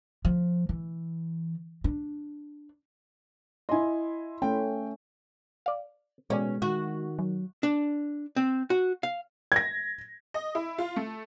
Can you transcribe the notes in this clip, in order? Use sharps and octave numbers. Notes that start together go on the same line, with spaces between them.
F3
E3
D4
E4 D#5 G#5 C6
A3 C#4 G5
D5 F5
A1 B2 G#3 C#4 D5
D#3 F#4
F#3
D4
C4
F#4
F5
G#6 A#6
D#5
E4
F4
A3